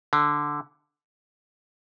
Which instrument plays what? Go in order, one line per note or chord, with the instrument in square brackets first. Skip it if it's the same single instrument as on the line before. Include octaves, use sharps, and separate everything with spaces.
[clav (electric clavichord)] D3